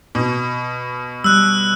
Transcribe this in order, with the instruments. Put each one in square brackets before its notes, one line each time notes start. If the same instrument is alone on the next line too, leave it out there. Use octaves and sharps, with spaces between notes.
[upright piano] B2
[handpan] G3 [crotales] E6 F#6